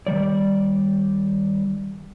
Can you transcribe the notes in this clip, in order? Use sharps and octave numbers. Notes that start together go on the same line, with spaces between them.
D#3 G3 D5